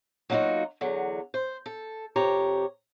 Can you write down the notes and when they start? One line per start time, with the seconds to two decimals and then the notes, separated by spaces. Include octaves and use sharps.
0.30 F#3 A#3 B3 D#4 F4 F#4
0.81 E2 D3 F#3
1.34 C5
1.66 A4
2.16 F2 C3 G4 C#5 A#5